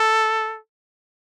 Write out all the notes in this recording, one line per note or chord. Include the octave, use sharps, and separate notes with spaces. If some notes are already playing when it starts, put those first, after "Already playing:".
Already playing: A4